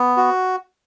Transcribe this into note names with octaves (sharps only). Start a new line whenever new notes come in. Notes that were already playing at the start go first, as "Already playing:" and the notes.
Already playing: B3
F#4